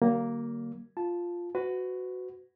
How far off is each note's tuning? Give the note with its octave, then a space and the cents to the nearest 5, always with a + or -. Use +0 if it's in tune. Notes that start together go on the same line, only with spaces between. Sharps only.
D3 +20 F#3 +45 A#3 +0
F4 +0 A5 -10
F#4 +0 B4 +30